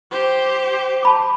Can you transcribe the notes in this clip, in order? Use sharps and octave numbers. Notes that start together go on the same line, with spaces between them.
G4 C5
A5 B5 D6